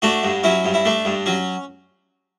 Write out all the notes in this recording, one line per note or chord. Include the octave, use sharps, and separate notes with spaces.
A3 D4 F#4
G2
F#3 C#4 E4
G2
E4
A3 D4
G2
F#3 C#4